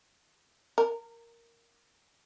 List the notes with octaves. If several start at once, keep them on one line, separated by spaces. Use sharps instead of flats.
A#4